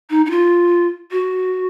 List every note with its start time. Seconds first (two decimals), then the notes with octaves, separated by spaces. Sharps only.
0.10 D#4
0.26 D#4
0.31 F4
1.11 F#4